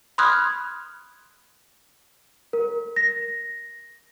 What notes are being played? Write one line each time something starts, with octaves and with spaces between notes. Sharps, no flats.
B5 C6 D#6 F6 F#6 G#6
A#4
A#6